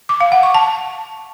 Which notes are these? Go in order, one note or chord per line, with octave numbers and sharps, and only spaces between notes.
D6
F5
F#5
C#6
A5